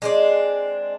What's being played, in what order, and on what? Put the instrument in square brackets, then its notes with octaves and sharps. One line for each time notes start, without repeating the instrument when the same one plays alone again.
[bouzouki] G#3 C4 D4